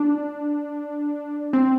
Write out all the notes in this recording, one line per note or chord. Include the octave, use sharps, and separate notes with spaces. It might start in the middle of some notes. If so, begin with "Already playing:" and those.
Already playing: D4
C4